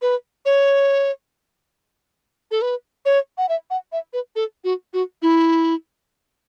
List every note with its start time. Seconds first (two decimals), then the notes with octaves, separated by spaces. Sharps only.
0.02 B4
0.46 C#5
2.51 A4
2.62 B4
3.05 C#5
3.38 F#5
3.49 E5
3.70 F#5
3.92 E5
4.13 B4
4.36 A4
4.64 F#4
4.93 F#4
5.22 E4